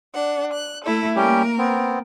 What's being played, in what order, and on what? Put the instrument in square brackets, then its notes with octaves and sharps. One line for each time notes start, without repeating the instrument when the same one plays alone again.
[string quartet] D4 F#5
F#6
A3 E4 A4
[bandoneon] G3 C#4 G4 [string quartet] A#3 A#4
[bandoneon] B3 C4